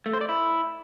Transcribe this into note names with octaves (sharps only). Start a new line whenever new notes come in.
A3
C5
D5
E4